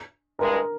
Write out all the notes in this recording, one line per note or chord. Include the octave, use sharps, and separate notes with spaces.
G2 E3 G#3 A#4